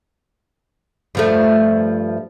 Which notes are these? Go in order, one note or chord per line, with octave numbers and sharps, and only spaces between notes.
G2 F3 A3